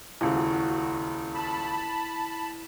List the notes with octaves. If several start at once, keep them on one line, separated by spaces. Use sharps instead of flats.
D#1 C#2 E4 F#4
A5 B5